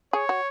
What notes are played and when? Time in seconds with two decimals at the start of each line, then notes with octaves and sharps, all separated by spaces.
0.13 G#4 C#5
0.29 F#4